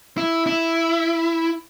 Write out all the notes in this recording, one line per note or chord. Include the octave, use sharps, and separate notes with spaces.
E4
E4